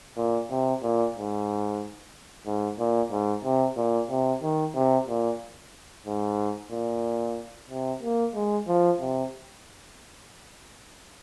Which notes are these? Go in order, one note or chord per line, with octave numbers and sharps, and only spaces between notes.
A#2
C3
A#2
G#2
G#2
A#2
G#2
C3
A#2
C3
D#3
C3
A#2
G#2
A#2
C3
A#3
G#3
F3
C3